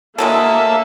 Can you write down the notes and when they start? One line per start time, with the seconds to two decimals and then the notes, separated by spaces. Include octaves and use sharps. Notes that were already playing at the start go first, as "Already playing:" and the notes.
0.18 D3 F#3 G#3 A#3 A4 E5